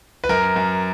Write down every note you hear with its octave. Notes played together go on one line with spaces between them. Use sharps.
B4
F#2 A#4
F#2